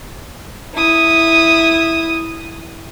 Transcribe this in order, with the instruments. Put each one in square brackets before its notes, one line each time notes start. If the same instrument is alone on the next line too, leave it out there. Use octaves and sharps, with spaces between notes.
[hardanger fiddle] E4 D#6